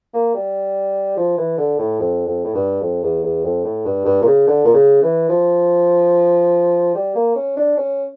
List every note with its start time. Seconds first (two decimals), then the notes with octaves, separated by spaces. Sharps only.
0.14 A#3
0.34 G3
1.17 F3
1.38 E3
1.57 D3
1.78 A2
1.99 F2
2.27 F2
2.44 A2
2.54 G2
2.82 F2
3.03 E2
3.23 E2
3.44 F2
3.64 A2
3.85 G2
4.05 G2
4.22 A#2
4.26 C#3
4.47 D3
4.65 A#2
4.74 C#3
5.02 E3
5.29 F3
6.95 G3
7.15 A#3
7.36 C#4
7.57 D4
7.77 C#4